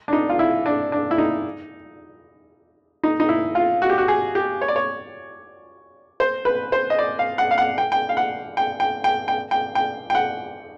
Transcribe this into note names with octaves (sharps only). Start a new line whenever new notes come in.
D4
D#4
F4
E4
D4
D4
E4
D#4
D#4
D#4
E4
F4
F#4
G4
F#4
G#4
G4
C#5
D5
C#5
C5
B4
C5
D#5
D5
F5
F#5
F5
F#5
G5
G5
F5
F#5
G5
G5
G5
G5
G5
G5
G5
F#5